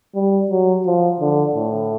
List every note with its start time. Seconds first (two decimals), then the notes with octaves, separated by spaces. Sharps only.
0.15 G3
0.50 F#3
0.86 F3
1.20 D3
1.55 A2